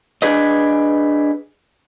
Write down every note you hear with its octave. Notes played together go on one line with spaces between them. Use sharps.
D4 G#4 B4 D#5